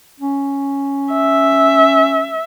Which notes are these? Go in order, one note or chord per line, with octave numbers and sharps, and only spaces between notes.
C#4
E5